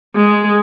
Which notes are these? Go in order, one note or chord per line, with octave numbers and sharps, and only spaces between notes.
G#3